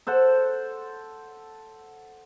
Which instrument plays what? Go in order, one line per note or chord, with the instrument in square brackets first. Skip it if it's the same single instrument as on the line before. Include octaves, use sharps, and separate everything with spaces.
[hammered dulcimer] A4 C5 F#5